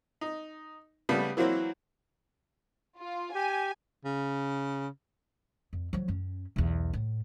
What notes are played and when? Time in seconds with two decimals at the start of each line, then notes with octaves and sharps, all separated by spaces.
0.21 D#4
1.09 C#3 G3 A3 B3
1.37 E3 F#3 A#3 C4 E4
2.98 F4
3.35 G4 G#5
4.05 C#3
5.73 F2
5.93 F3 F#3
6.08 F#2 C#4
6.56 B1 E2
6.93 A2